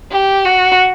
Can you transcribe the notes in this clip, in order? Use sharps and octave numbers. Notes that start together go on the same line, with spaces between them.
G4
F#4